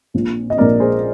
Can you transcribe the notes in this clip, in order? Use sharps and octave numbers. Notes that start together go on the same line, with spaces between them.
A#1 A#2 F3
D#5
A#1 A#2 F3 A#4 D5
G#4 C5